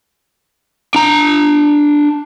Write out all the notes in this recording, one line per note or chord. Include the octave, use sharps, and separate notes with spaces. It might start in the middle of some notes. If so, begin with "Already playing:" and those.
D4 A#5